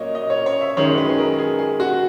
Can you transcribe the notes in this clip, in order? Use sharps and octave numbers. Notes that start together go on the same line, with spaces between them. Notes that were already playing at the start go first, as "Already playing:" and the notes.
Already playing: A#2 F#3 A#3 C#5 D#5
D#5
C#5
C#5
E5
F#2 D#3 G#3 C#5
B4
G#4
A#4
G#4
G#4
F#4